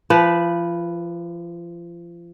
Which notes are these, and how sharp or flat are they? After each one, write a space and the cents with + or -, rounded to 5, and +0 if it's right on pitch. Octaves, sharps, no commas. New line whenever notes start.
F3 -30 B4 +0